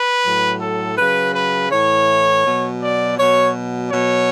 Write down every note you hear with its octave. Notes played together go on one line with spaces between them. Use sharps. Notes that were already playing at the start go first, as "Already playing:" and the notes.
Already playing: B4
A2 F#3
A4
C#3 F#3 B4
B4
A2 E3 C#5
B2 F#3
D5
B2 F#3 C#5
B2 F#3 C#5